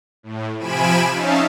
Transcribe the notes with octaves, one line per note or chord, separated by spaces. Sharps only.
A2
C3 F3 G#5 B5 D7 E7
C#4 D#4 E5 F5 A5